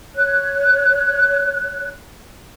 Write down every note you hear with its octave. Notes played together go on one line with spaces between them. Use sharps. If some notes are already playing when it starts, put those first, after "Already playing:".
C#5 F#6